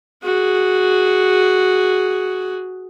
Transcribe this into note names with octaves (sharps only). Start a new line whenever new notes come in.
F#4 G#4